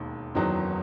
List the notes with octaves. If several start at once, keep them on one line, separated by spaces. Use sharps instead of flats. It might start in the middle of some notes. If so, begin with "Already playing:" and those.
Already playing: E1 D#2 D#3
F#1 E2 D#3 F#3 B3 D#4